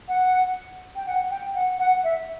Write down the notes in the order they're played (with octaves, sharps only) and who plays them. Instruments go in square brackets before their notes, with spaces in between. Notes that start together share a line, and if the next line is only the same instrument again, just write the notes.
[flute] F#5
G5
F#5
G5
F#5
F#5
E5